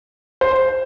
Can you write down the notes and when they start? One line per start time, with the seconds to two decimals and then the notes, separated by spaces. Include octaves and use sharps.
0.41 C5